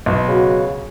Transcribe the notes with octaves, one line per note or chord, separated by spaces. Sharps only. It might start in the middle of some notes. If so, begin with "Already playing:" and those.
B1
C#3 F#4